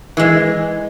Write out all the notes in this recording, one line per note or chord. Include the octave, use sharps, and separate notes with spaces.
E3 G#3